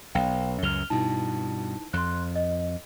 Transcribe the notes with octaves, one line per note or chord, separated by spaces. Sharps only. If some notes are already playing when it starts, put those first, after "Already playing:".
B1 F5 G5
C#2 F#2 F#3 F6 F7 G7
G2 B2 D#4 E4 A5
F2 C6 F#6
D#5